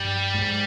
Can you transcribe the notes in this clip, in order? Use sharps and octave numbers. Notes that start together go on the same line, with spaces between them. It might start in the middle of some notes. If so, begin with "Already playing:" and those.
Already playing: G2 G3
G#2